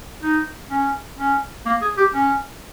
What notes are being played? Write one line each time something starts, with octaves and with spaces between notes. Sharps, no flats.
D#4
C#4
C#4
A#3
G#4
G4
C#4